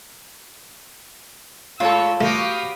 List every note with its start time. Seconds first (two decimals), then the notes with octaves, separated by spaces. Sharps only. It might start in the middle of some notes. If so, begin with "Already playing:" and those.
1.80 A2 G#3 F4 A4 C#5 E6
2.21 A3 B3 F#4 G4 F5 D#6